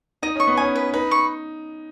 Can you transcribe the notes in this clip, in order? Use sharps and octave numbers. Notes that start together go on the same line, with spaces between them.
D#4 D#5
C#4 C#6
B3
C#4 G#5
B4
D#4 B4
C#6